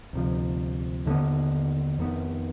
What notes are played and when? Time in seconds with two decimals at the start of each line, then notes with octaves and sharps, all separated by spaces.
0.13 D2 C3 F3
1.06 D#2 D3 G#3 B3
1.98 F2 D#3 B3